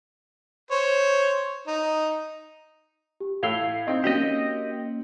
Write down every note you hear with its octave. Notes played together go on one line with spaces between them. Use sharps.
C5 C#5
D#4
G4
A2 F5 E6 G#6 C7 F7 G7
C4 D#4
A#3 C#4 F#4 G4 D#5